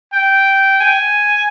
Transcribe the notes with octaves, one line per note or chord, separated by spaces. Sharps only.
G5
G#5